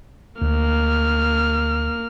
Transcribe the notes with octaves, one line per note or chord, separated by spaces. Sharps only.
D2 A#3 F6